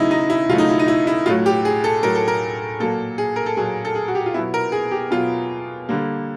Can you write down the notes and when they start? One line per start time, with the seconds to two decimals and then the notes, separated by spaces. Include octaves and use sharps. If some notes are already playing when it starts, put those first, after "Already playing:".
Already playing: C#3 F#3 A3 D#4 E4
0.11 D#4
0.30 E4
0.49 C#3 F#3 A3 F4
0.58 D#4
0.69 E4
0.79 D#4
0.88 E4
1.07 E4
1.26 A2 F#3 A3 F4
1.46 G4
1.65 G#4
1.84 A4
2.03 A2 F#3 A3 A#4
2.15 A4
2.28 A#4
2.80 A#2 F#3 A#3 A4
3.18 G#4
3.36 A#4
3.46 A4
3.57 A#2 F#3 A#3 G#4
3.85 A4
3.95 G#4
4.08 F#4
4.15 G4
4.26 F4
4.34 B2 F#3 B3 E4
4.54 A#4
4.72 G#4
4.91 G4
5.11 B2 F#3 B3 F4
5.89 D3 G3 A#3